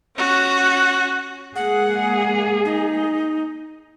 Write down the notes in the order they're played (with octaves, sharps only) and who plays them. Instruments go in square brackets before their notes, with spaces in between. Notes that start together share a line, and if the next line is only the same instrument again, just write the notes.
[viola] C#4 F#4
[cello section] G#3 A#3 G#4 [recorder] F#5
[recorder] D#4